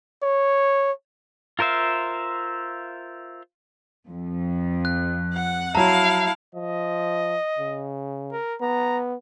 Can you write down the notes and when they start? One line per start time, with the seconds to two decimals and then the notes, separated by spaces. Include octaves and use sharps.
0.23 C#5
1.59 F4 A#4 C5 E5 F5
4.07 F2
4.85 F#6
5.34 F#5
5.75 F#3 E4 F5 A5 A#5
6.54 F3 D#5
7.58 C#3
8.32 A#4
8.61 B3 A#5